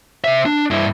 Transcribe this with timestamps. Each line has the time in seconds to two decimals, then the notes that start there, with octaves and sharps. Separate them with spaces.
0.24 C3 E5
0.45 D4
0.71 G2 E4